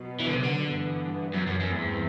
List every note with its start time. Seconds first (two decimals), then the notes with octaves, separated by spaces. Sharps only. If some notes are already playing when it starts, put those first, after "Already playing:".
Already playing: B2 F#3 B3
0.20 E3
0.27 D3
0.35 C3
0.43 D3
0.71 G2 E3 B3
1.34 F#2
1.47 F#2
1.60 F#2
1.73 E2 G2 E3 A3 C4